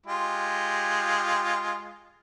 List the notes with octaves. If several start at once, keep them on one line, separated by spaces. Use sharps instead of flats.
G#3 F4 G4